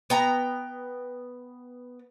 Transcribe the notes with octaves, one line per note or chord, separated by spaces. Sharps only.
B3 G5 A#5